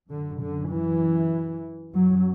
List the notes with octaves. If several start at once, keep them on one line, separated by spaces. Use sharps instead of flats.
F#2 D3
D3
E3
F#2 F#3